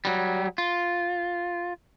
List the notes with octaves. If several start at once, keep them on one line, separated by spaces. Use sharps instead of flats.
F#3 G3
F4